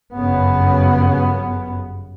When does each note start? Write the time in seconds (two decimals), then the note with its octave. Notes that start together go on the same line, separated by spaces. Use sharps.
0.13 G1 F#2 C#3 B3